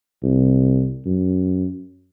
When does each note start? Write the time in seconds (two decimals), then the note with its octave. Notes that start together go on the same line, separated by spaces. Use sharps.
0.24 C2
1.06 F#2